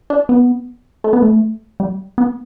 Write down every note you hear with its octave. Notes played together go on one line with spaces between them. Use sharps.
D4
B3
A3
B3
A3
G3
B3